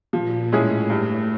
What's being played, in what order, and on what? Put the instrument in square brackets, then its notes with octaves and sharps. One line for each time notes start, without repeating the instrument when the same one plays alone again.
[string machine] A#2 [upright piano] F3
[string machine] A2 [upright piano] G#3 C#4 E4 G#4
[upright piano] G2